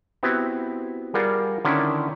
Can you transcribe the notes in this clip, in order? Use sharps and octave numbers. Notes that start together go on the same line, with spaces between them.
B3 C4 E4 F#4 G4
G3 F4 G#4 A#4 D5 F#5
D3 D#3 C#4 D4 E4